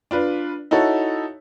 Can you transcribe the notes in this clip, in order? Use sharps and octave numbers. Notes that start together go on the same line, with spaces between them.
D4 F4 B4
D#4 E4 F#4 A4 C#5